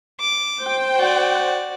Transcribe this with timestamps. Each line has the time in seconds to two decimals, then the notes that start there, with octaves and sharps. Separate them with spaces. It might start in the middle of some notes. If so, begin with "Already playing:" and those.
0.20 D6
0.62 C5 G5
0.95 F#4 D5